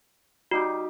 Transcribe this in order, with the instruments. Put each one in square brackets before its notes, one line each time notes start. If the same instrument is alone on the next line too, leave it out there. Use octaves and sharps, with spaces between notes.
[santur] G3 D#4 G4 [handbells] F#4